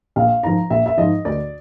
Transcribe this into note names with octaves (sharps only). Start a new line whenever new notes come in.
A#1 F5
G#2 F3 A#5
A#1 E5
E5
G#2 F3 D#5
D2 D5